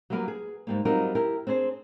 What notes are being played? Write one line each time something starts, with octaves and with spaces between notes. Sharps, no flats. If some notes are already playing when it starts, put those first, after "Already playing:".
F#3 G3 A#3 G4 A#4 B4
G#4
G#2 G3 A#3
F#3 G3 C4 D#4 F4 A#4
E4 G4 A#4
C4 D4 G#4 C5